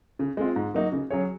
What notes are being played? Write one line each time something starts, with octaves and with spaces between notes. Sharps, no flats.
C#3
G#3 C4 F4
G#2
F#3 A#3 D#4 F#4
C#3
F#3 C#4 G#4 C#5